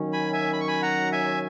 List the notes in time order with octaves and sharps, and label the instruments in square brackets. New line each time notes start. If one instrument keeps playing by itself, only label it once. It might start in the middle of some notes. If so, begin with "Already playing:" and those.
Already playing: [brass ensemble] D#3 F#3 C#4
[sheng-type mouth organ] G#5 B5
E5 G#5
B5
C#6
G#5 B5
F#5 A#5
E5 G#5